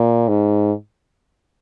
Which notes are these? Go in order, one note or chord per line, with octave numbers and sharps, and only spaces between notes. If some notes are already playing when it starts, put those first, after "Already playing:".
Already playing: A#2
G#2